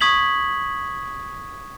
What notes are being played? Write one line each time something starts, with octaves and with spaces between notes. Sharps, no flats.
C#6 D#6 G#6 B6 F#7